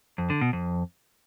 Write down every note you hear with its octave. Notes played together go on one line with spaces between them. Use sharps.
F2
D3
B2
F2